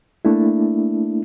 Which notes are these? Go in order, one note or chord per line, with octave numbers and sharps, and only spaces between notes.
A3 A#3 D4 E4